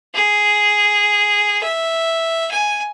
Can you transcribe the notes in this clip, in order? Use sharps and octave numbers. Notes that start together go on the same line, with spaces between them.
G#4
E5
G#5